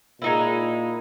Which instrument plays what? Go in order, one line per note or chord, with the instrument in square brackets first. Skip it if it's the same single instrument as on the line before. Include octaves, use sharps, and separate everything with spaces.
[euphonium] A#2 [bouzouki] G#3 D#4 E4